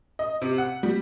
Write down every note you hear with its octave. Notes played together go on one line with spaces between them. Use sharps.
D#5
C3
F#5
G3